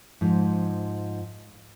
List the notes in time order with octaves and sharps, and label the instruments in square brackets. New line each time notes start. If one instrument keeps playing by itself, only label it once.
[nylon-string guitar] G#2 F3